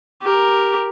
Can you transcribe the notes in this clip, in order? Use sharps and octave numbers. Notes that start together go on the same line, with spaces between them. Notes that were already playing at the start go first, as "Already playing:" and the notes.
G4 A#4